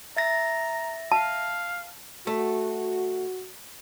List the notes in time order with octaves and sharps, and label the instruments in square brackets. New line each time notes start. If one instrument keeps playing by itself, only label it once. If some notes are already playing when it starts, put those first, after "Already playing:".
[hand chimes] E5 A6 A#6 [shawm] A#5
[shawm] F5 [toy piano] A5
[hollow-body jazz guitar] A3 [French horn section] F#4